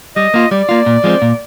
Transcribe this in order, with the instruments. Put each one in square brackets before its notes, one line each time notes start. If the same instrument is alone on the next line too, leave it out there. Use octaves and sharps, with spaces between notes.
[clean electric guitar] G3 [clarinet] D#5
[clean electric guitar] A#3 F4
[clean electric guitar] G3 [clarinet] D5
[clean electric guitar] A#3 F4
A#2
F3 G#3 C4
A#2